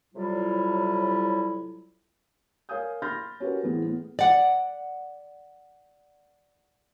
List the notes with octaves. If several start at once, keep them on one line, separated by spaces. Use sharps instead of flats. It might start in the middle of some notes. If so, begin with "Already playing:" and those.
A2 C3 F#3 G3 E4 F4
A#4 C#5 F5 G#5 D#6 G6
B5 C6 F6 G6 A6 A#6
C#4 F#4 G4 A#4 B4
A2 E3 B3 C4 G#4
A2 B3
D5 F#5